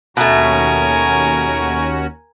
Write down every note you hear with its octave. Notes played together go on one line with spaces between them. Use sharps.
D#2 B2 A3 C#4 F#4 A#4 G#5